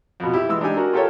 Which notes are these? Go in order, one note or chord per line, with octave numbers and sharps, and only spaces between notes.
F2 B2
E4 G4
E3 G#3 E6
D4 D#4 G4 G#5
F#4 A#4
F4 G4 A4 A#4 C#5 G5